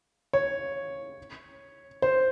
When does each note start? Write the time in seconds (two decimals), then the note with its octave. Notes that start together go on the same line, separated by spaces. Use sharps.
0.33 C#5
2.02 C5